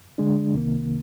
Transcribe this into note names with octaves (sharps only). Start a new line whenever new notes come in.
D3 G#3 D4
C2 C3 D#3 A#3